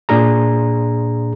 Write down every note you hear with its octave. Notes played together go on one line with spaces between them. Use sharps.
A#2 D4 G#4 A#5